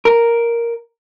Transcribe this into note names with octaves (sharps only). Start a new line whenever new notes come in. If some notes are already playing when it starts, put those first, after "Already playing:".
A#4